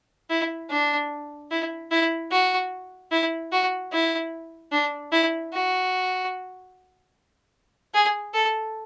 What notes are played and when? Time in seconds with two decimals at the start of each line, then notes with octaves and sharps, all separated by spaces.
0.30 E4
0.70 D4
1.51 E4
1.91 E4
2.31 F#4
3.11 E4
3.52 F#4
3.92 E4
4.72 D4
5.12 E4
5.53 F#4
7.94 G#4
8.34 A4